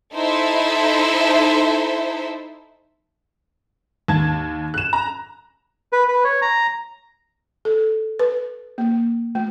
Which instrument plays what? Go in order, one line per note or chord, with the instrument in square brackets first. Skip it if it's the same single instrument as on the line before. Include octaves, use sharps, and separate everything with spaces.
[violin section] D#4 E4 A4 C5 E5
[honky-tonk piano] D#2 A5 G#6
F#6 E7
A#5
[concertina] B4
B4
C#5
A#5
[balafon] A4
B4
A#3
A3